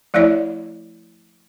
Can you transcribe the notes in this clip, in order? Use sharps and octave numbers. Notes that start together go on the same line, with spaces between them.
F3 A3 E4 C#5 D5 E5